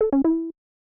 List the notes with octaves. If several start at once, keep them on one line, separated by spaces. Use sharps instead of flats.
A4
C#4
E4